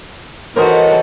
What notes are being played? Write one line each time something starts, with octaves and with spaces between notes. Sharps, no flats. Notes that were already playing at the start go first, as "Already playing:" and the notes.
E3 D#4 F#4 A4 A#4 C5 C#5